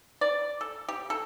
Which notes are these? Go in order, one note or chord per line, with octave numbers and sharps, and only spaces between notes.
D5
A4
G4
A4